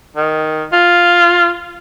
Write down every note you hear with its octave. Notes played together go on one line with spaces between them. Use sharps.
D#3
F4